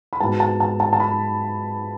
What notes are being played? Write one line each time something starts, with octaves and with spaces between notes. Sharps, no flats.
B5
G#2 G#3 B3 F#4 A5
A5
A5
A5
A5
B5